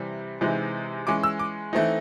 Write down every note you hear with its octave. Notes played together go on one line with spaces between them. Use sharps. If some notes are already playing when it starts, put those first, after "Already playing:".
Already playing: C3 E3 G3 C4
C3 E3 G#3 C4 D#4
E3 G#3 C#4 D6
E6
D6
E3 A3 C4 D#4